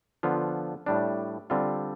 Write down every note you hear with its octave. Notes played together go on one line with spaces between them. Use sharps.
D3 F3 B3 F4
A2 G3 D4
D3 G3 C4 F4